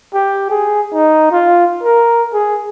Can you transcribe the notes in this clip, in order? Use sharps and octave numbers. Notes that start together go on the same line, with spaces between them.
G4
G#4
D#4
F4
A#4
G#4